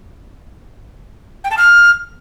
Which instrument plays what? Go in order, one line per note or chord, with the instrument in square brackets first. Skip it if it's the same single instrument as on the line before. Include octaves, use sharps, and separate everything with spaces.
[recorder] G5
A5
F6